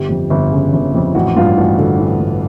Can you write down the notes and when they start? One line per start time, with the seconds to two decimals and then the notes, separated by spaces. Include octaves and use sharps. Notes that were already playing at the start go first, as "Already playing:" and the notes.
Already playing: G1 G4
0.09 F2
0.30 G1
0.52 C#3
0.73 G1
0.95 F2
1.15 A1 F#4
1.36 G2 F4
1.57 A1 F#4
1.78 D3 F#4
1.99 A1
2.20 G2